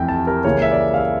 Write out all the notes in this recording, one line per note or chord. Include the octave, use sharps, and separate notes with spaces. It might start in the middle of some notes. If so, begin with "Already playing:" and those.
Already playing: F2 E3 A3 G5
A5
A#4
C#2 C#3 E3 A#3 C#5
E5
D5
F5
E5